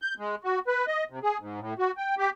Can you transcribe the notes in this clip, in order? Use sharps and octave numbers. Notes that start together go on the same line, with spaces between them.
G6
G#3
F#4
B4
D#5
C3
G#4
G#2
A2
F#4
G5
G4